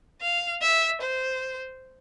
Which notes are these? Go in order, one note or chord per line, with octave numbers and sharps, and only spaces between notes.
F5
E5
C5